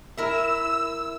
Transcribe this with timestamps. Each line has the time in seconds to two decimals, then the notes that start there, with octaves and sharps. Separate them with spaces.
0.17 E4 A#4 E5 E6